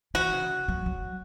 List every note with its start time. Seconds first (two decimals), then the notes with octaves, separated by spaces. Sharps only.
0.14 E3 F#4
0.33 C#3
0.68 F#3
0.86 F#3